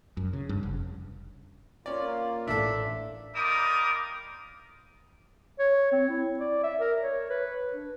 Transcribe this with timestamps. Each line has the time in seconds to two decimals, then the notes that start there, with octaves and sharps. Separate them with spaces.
0.17 F#2
0.33 C#3
0.49 G2
0.63 F1
1.86 A#3 C#4 F4 D5
2.48 A1 D4 A4 E5
3.36 G3 D#4 F4 A#4 D6 D#6
5.59 C#5
5.92 C4
6.09 E4
6.40 D5
6.63 E5
6.80 A#4
7.02 C#5
7.30 B4
7.73 D4